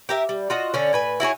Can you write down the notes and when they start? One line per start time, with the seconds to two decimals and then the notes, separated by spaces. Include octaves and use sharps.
0.09 G4 A#4 E5
0.29 G3
0.50 F4 F#4 D#5
0.74 D3 C#4
0.93 A2 B4 G#5
1.20 E4 F#4 G#4 C#5